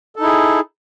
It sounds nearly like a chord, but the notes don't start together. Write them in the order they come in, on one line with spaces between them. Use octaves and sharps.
A4 D#4 E4 G#4